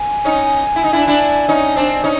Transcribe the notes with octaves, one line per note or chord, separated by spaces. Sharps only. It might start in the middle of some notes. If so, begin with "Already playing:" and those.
Already playing: G#5
C#4 D#4
E4
D#4
D4 E4
D4 E4
C#4 D#4
C4 D4
C#4 D#4